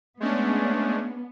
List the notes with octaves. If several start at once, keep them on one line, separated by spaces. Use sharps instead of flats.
G#3 A3 B3 C#4 D4